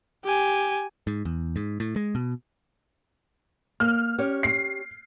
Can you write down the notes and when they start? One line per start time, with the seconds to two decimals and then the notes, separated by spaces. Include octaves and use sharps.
0.24 G4 G#5
1.07 G#2
1.25 E2
1.56 G#2
1.80 A2
1.96 G#3
2.15 B2
3.80 A#3 F6
4.19 C#4 G4 C#5
4.43 C7